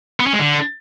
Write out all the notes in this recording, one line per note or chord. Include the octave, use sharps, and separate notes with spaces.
B3
C#4
G#3
D3